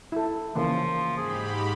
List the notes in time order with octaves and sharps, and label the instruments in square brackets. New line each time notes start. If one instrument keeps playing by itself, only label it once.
[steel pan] E4 A4
[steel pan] C#3 E3 A#3 [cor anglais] F3
[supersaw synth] G#2 G4 B5 [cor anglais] G#4